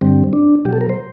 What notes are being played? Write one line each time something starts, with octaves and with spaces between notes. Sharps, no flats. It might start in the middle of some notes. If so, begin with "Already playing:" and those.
G2 D3 G3 C4
D4
B2 F#3 G4
A4
A#4
C5